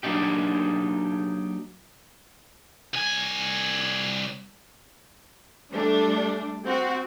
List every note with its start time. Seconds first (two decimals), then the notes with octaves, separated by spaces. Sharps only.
0.03 F#3 A#3 D4 D#4 G4
2.94 C2 G#5
5.71 G3 A3 D4
6.66 C4 F#4